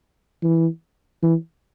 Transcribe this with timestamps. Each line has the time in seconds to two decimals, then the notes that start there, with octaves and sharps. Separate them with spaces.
0.43 E3
1.23 E3